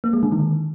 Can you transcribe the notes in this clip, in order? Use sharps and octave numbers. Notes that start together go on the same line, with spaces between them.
A#3
G#3
D3
D#3